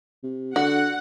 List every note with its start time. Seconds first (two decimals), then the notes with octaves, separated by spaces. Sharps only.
0.24 C3
0.56 D3 F#4 F#5